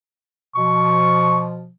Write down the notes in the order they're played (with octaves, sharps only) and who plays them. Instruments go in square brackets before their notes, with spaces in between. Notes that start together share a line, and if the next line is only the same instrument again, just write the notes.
[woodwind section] B2 F3 [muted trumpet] C#6